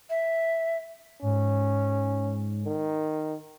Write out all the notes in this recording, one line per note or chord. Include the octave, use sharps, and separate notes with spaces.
E5
G#2 C#4
D#3